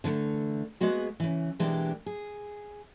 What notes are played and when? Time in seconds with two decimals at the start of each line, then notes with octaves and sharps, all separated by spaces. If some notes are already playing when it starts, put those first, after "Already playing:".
0.04 D3 E3 F3 A3
0.81 G#3 A#3 B3 F#4 G#4
1.20 C#3 E3
1.59 B2 E3 G#3 A#3 D4 G4
2.06 G#4